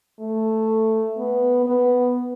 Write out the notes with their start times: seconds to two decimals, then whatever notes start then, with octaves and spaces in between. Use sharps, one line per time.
0.20 A3
1.17 B3
1.66 B3